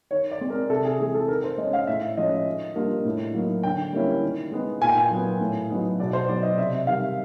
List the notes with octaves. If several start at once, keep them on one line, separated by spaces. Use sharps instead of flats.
D#3 C#5
D5
G#3 C4
A#4
C3 A4
G#4
E3 G#3 C4 G#4
A4
D#3 A#4
C5
G#3 C#4 D#5
F5
A2 E5
F3 G#3 C#4 D#5
D#3
G3 A#3 D4 F4
A2
F#3 A#3 D#4
D3 G5
G3 A#3 C#4 E4
D#3
G#3 B3 D#4
A#2 G#5
G5
G#5
F#3 B3
A2
F#3 B3 D#4
B2 D5
C5
F#3 B3 D5
D#5
C3 E5
D#3 G3 F5